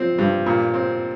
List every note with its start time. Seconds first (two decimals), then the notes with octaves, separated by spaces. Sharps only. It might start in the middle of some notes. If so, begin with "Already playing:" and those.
Already playing: F3 C4
0.18 G2
0.46 A#2
0.74 C4